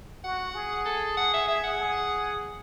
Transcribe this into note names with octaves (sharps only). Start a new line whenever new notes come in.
F#4 F#5
G#4
A4
F#5
E5
E5
F#5
G#4